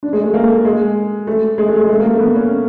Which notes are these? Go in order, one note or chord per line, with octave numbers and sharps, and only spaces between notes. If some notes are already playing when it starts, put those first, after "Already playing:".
D4
G#3
A3
A#3
A3
A3
G#3
A3
G#3
A3
G#3
A3
A#3
A3
B3
C#4